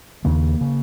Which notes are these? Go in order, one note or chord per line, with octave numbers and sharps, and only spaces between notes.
D#2 C#3 A#3
C#3